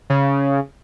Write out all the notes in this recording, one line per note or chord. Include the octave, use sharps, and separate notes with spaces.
C#3